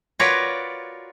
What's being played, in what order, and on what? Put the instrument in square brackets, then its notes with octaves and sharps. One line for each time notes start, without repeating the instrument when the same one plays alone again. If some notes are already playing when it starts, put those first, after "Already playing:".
[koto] F4 F#4 A#4 B4 C#5 D5